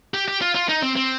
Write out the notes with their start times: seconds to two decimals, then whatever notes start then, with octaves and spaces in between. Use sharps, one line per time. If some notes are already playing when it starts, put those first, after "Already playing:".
0.14 G4
0.28 G4
0.41 F4
0.55 F4
0.69 D#4
0.83 C4
0.96 C4